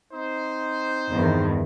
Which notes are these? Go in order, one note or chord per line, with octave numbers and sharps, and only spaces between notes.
C4 D#4 C5
E2 G2 D#3